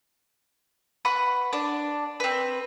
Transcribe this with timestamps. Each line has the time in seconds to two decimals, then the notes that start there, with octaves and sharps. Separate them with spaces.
1.05 B4 F#5 C#6
1.53 D4
2.20 C4 B4